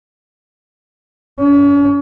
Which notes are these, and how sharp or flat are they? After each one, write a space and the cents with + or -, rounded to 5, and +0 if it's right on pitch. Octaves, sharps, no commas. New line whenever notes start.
C#4 +40